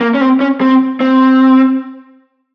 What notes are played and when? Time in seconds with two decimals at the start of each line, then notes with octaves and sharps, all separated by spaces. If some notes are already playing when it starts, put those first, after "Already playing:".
0.01 A#3
0.14 C#4
0.21 C4
0.40 C#4
0.61 C4
1.00 C4